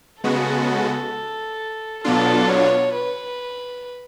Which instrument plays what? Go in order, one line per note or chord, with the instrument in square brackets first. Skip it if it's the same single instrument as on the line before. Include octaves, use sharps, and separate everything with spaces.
[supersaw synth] C#3 G#3 B3 F#4 [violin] A4
[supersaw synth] B2 F#3 B3 D4 F4 [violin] A4
[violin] C#5
B4